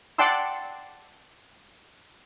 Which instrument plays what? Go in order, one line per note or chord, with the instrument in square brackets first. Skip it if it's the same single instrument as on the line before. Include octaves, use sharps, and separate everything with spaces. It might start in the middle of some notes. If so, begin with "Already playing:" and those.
[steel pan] D5 F#5 G5 A5 C6 E6